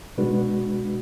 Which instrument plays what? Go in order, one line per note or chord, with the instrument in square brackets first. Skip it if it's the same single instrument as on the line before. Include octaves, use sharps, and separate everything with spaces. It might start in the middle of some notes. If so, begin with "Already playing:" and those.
[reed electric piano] B2 G#3 D4 F#4 B4